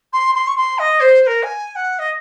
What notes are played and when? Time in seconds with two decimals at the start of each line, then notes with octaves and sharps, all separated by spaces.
0.12 C6
0.34 C6
0.47 C#6
0.56 C6
0.78 D#5
1.00 C5
1.22 C5
1.26 A#4
1.43 G#5
1.75 F#5
1.99 D#5